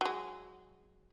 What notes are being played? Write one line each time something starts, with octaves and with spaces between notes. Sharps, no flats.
F#3 G#3